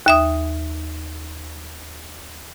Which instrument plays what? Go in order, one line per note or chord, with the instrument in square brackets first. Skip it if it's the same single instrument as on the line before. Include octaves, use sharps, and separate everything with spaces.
[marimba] D#2 E5 D#6